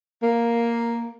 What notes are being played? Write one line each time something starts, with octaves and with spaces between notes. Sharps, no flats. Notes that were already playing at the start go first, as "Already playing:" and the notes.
A#3